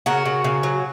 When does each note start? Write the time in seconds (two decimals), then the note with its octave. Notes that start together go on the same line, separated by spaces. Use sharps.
0.06 C#3 F#4 A#4
0.25 C#3
0.44 C#3
0.63 F#3